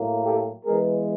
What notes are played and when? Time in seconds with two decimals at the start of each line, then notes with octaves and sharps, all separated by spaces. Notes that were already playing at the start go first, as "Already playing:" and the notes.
Already playing: A2 F#3 A#3
0.24 G4 A4
0.65 E3 G#3 B3 G#4 A#4